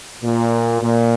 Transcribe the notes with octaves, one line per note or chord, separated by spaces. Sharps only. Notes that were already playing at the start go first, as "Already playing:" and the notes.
A#2
A#2